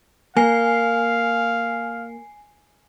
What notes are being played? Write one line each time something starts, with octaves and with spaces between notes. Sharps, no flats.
A#3 F5 G#5 C7